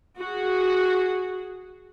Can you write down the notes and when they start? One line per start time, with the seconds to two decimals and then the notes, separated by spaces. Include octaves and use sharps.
0.18 F#4 G#4